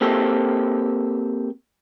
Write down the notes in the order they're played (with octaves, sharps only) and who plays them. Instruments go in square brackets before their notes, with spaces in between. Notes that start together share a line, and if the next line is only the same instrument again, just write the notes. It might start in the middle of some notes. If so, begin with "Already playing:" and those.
[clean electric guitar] A#3 C4 G4 A4